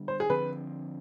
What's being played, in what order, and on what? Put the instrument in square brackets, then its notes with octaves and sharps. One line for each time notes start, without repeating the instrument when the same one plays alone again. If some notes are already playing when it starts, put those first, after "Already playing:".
Already playing: [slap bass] D3 G3 B3
[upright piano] C5
G#4
[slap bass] D3 F3 C4 [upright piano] B4